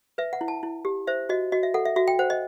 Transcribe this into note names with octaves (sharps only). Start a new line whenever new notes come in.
B4 E5
F#5
E4
A5
E4
G4
C5 E5
F#4 D#5
F#4 D#5
E5
A4 F#5
E5
F#4 E5
G5
C5 F#5
D#5